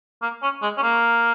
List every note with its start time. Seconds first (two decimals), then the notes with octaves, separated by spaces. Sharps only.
0.22 A#3
0.43 C#4
0.62 G#3
0.77 C#4
0.82 A#3